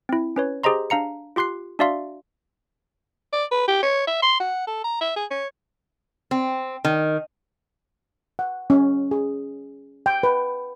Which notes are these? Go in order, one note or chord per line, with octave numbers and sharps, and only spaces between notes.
C4 E4
C#4 B4 C#5
G4 G#4 C5 D#5 A#5 C6
D4 F5 A#5 C#7
F4 G4 C6 F#6 C7
D4 F#4 D5 E5 F5 C6
D5
B4
G4
C#5
E5
C6
F#5
A4
A#5
E5
G#4
C#5
C4
D#3
F#5
C#4
G#4
G5
B4